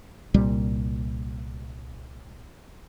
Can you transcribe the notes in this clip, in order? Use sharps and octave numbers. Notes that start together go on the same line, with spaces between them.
C2 A#2 G3